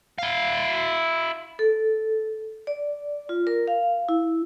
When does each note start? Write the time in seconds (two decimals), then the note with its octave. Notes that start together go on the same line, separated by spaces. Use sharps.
0.19 E4 F5
1.59 A4
2.67 D5
3.29 F4
3.47 A#4
3.68 F5
4.09 E4